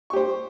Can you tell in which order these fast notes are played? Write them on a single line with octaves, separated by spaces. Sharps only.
C#6 G4 C5